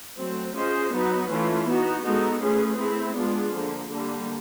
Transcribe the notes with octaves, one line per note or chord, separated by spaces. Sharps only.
F#3 A3 C4
C#4 F4 G#4 C5 D#5
F#3 B3 D#4 F#4 B4
E3 A3 C#4 F4
B3 D#4 F#4
G#3 B3 D#4 F#4 A4
A3 C#4 F4 G#4 B4
A3 C4 E4
G#3 B3 D4 F4 G#4
D3 F3 A#3
D3 G3 A#3